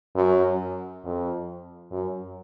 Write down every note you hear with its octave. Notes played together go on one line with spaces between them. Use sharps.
F#2
F2
F#2